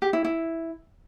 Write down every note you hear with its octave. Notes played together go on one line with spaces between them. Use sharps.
G4
E4
E4